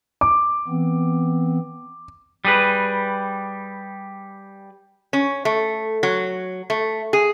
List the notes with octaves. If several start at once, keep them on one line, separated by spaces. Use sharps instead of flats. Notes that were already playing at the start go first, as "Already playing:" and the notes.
D6
E3 B3 C4
G3 G#4 B4
C#4
A3
F#3
A3
G#4